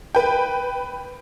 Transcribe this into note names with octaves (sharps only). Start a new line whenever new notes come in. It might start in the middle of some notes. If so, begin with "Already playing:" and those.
B4 G5